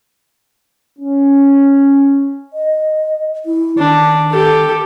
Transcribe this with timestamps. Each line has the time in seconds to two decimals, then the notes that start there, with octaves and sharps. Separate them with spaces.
0.99 C#4
2.53 D#5
3.46 E4
3.78 D#3 D4
4.31 G4 A4